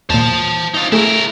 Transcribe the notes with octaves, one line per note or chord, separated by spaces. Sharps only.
D#2 A#2 C5 A5
D#4 F4
A3 E4 G#4 A#4